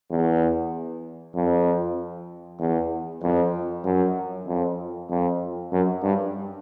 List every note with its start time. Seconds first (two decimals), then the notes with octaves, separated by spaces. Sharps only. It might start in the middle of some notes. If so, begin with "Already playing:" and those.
0.11 E2
1.35 F2
2.60 E2
3.23 F2
3.85 F#2
4.47 F2
5.10 F2
5.72 F#2
6.03 G2